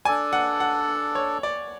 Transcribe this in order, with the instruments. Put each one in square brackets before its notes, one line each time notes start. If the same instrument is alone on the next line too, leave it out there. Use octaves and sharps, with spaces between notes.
[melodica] D4 A4 D5 [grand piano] G#5
[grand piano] F#5
F#5
C#5
D5